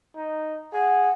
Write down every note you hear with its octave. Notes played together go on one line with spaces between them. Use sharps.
D#4
G#4 F#5